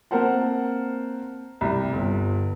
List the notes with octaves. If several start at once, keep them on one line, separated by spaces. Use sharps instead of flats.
A#3 C4 A#4 C5 F#5 A5
C2 G3
G1